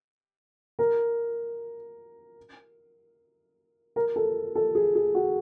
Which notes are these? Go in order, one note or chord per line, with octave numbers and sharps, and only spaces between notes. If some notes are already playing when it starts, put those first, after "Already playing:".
A#4
A#4
A4
A4
G#4
G#4
F#4